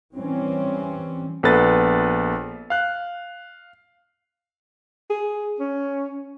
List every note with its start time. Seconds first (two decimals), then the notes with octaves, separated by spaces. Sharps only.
0.14 E3 G3 C4 C#4
1.43 A#1 B3 A4 B4 A6
2.70 F5 F#6
5.10 G#4
5.60 C#4